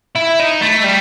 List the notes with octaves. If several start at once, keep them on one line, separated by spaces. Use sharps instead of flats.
E4
D#4
A3
G3